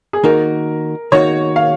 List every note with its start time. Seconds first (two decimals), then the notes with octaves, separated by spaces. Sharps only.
0.13 G#4
0.24 D#3 A#3 D#4 F#4 A#4
1.12 D#3 A#3 D#4 F#4 C#5
1.56 F5